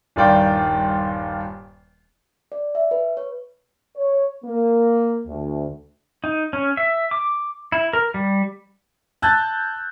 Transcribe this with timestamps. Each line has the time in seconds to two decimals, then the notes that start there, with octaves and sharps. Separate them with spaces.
0.16 D#1 G2 D#3 F4 D5 G5
2.52 D5
2.75 E5
2.91 B4
3.17 C#5
3.96 C#5
4.43 A#3
5.27 D2
6.24 D#4
6.53 C#4
6.77 E5
7.11 D6
7.72 E4
7.93 A#4
8.14 G3
9.22 A5 E6 F#6 G6 A6